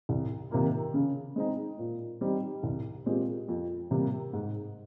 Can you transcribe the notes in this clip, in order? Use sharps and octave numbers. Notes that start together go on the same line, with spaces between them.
C2
C3 D#3 A#3 F4
C#3
G#3 C4 D#4
A#2
G3 C4 D#4
C2
A#2 G#3 C4 G4
F2
C3 G3 A#3
G#2